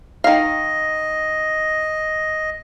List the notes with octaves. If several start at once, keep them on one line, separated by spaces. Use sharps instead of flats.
D#3 D#5 F5